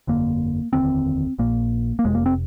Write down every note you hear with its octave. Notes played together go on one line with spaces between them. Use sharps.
G1 F2 D3 A#3
F1 D#2 D3 C4
A#1 A#2 A#3
A#3
F1 F2 C3 G#3
A#3
C4